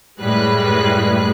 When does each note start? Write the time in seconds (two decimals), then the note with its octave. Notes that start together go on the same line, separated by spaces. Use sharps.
0.19 F#2 A2 G3 G#3 B4 F#6